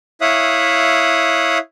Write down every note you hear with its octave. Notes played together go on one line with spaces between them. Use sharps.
E4 C#5 E5 F5 D#6 F#6